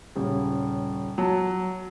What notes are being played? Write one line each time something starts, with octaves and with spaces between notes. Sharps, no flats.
D#1 C#3
F#3 A5